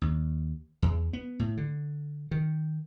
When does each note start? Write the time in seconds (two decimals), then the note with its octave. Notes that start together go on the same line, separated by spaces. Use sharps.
0.02 D#2
0.82 E2
1.13 B3
1.39 A2
1.57 D3
2.31 D#3